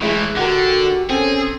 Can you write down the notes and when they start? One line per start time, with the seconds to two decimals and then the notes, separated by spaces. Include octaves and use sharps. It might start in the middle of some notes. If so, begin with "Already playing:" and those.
0.02 A2 E3 G#3 E4 G#4
0.37 D3 F#4 G4 A#4 F#5
1.09 C4 C#4 G#4 A4 G5